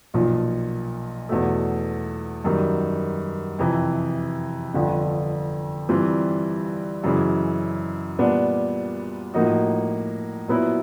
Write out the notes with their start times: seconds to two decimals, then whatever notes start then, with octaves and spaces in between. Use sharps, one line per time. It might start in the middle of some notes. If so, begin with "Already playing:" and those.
0.14 B1 A#2 F3
1.29 E2 B2 F#3 A3
2.44 F#2 D#3 G3
3.59 F2 C3 E3
4.74 G1 F2 D3
5.89 G2 E3 G3 C4 F4
7.04 F#2 C#3 E3 G#3
8.19 A#2 G3 B3 D4
9.34 A2 F3 A#3 D#4 F#4
10.48 A#2 F#3 B3 E4